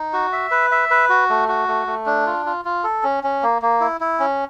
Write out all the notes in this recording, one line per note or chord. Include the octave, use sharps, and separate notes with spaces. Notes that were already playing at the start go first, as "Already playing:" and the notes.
Already playing: D#4
F#4
E5
B4
E5
B4
F#4
A3
F#4
A3
A3
D4
F4
F4
F4
A4
C#4
C#4
A#3
A#3
E4
E4
C#4